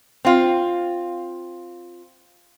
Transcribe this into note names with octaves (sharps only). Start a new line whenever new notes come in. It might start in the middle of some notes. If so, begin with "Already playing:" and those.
C4 F4